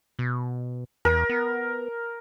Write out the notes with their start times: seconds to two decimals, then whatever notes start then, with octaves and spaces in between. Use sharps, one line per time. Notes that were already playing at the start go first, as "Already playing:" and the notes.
0.19 B2
1.05 E2 A#4
1.29 B3